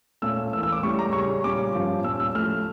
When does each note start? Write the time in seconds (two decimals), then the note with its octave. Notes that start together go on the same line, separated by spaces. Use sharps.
0.22 A#2 A3 C#4 E6
0.53 A2 E3 A#3 E6
0.63 E6
0.72 D6
0.83 A2 G3 C#4 C#6
0.99 A#5
1.13 C#3 G3 C#4 C#6
1.44 A#2 G3 C#4 D6
1.75 G2 F3 A#3 C#4
2.04 A#2 G3 C#4 E6
2.20 E6
2.35 A2 F3 A3 C#4 F6